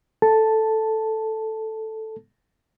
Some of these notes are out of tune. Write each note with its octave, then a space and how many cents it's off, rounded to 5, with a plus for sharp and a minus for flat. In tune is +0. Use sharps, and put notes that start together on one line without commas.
A4 +0 A5 +0